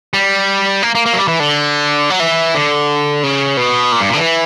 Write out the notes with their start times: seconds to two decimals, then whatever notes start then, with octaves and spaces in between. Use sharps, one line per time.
0.14 G3
0.83 A#3
0.95 A#3
1.06 A#3
1.13 F#3
1.18 G3
1.28 E3
1.40 D3
2.10 F#3
2.20 E3
2.55 D3
3.23 C#3
3.57 B2
3.92 A#2
4.01 G2
4.09 A#2
4.13 D3
4.17 E3